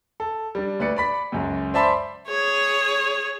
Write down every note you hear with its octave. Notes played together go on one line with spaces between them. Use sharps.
A4
G3 D4
D2 B4 D5 C#7
D5 B5 B6
C#2 F#2
C5 D5 E5 A5 B5 C6
G#4 C#5